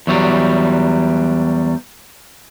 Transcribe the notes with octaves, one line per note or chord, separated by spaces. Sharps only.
E2 F#3 G3